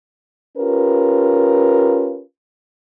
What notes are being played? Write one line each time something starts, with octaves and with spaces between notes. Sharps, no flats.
C#4 F4 G4 A#4 B4